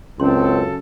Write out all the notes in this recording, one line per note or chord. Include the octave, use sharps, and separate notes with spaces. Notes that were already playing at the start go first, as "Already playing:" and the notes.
C#2 F#2 C#3 C4 C#4 A4 C6